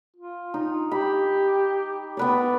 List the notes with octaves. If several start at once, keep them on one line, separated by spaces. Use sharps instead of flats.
F4
D#4
G4 B5
B3 B4 D5